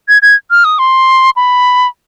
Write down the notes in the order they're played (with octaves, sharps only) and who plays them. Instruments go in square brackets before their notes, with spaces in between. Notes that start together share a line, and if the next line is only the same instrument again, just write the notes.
[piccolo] G#6
G#6
F6
D#6
C6
B5